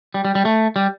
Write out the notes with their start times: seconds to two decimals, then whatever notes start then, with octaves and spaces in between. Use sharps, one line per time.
0.14 G3
0.25 G3
0.35 G3
0.45 A3
0.76 G3